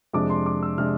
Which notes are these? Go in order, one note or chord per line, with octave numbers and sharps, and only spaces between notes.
F2 C3 G#3 D4 D6
C6
D6
E6
C3 G#3 D4 F6